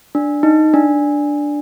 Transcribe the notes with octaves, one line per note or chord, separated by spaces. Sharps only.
D4
D#4
D4